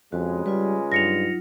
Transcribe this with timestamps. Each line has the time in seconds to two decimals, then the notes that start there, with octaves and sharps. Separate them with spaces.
0.12 F2 C#3 G#3 F#4 B4
0.46 G3 F4 B4
0.92 G2 F#3 D#4 F4 A#6 C#7 F7